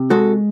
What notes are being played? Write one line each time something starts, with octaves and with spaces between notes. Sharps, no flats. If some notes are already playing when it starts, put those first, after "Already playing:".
Already playing: C3
G#3 F#4 A4